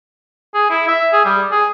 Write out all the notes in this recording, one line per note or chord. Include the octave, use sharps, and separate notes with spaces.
G#4
E4
E5
G#4
G3
G#4